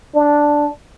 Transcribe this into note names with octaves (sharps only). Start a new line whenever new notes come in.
D4